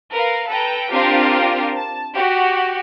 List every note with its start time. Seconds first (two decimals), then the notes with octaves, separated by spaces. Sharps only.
0.12 A#4 B4 F5
0.49 A4 B4 G5 A#5
0.91 C4 D4 F4 G4 A#4 F5
1.75 A5
2.14 F#4 G4